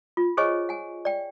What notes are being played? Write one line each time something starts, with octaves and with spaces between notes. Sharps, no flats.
F4
G#4 C5 C#5 D#5 G#5 C#6
F#5 G#5
D5 G5